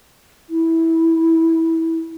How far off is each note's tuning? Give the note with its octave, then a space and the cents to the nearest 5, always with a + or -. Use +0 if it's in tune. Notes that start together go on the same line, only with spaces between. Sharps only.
E4 -15